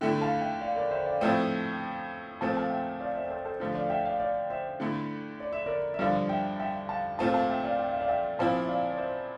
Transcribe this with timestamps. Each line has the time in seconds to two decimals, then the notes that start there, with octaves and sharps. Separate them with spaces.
0.01 D3 A3 E4 E5 G5
0.22 F5 A5
0.41 E5 G5
0.61 D5 F5
0.76 A#4 D5
0.91 C5 E5
1.06 D5 F5
1.21 A2 F3 A3 C4 E5 G5
2.41 A#2 F3 A3 C4 A5
2.57 F5 A5
2.70 E5 G5
3.00 D5 F5
3.15 C5 E5
3.30 A4 C5
3.45 A4 C5
3.60 D3 F3 A3
3.75 D5 F5
3.86 F5
3.90 E5 G5
4.05 D5 F5
4.20 D5 F5
4.50 C5 E5
4.80 D3 A3 E4
5.40 D5
5.53 E5
5.66 A#4 D5
5.94 E5
5.99 G2 D3 F3 D5 F5
6.29 E5 G5
6.60 E5 G5
6.89 F5 A5
7.19 A#2 A3 C4 F4 F5 A5
7.34 F5 A5
7.49 E5 G5
7.64 D5 F5
7.79 G5
7.86 F5
7.94 E5
8.01 D5 F5
8.09 E5 G5
8.39 A#2 F3 C4 E4 F5 A5
8.63 E5
8.68 D5 F5
8.90 D5
8.98 C5 E5